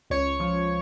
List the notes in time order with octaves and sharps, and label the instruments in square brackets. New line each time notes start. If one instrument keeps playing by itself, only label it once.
[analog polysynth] C#2 C#5 C#6
F3